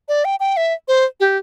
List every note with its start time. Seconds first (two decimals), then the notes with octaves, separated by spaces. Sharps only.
0.09 D5
0.25 G5
0.40 G5
0.57 E5
0.88 C5
1.20 G4